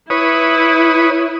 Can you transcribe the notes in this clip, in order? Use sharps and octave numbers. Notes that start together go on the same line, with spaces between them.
E4 B4 C#5 D#6